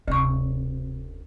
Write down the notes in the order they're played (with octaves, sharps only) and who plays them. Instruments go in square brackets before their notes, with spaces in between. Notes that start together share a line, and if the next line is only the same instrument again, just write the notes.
[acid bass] E1 [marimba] D2 C#6 [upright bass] C3